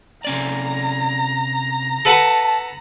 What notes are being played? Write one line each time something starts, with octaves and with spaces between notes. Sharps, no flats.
C3 C#4 D5 A#5
A4 B4 F#5 A5